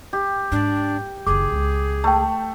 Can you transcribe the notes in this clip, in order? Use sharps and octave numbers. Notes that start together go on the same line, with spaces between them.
G4
G#2 D4
F#1 D#3 G#4 D6
C#2
A3 G5 A5